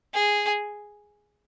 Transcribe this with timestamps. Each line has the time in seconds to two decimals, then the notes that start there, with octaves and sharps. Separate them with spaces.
0.13 G#4